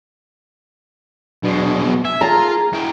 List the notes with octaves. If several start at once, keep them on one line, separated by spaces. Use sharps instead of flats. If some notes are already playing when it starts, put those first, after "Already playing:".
B2 F#3 G#3 D4
F#3 B3
E5 G#5
F4 G#4 A#5
E3 G5